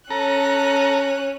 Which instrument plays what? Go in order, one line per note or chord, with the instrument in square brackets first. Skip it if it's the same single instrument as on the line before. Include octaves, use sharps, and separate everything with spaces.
[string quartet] C#4 F#6 [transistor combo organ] A4 A#5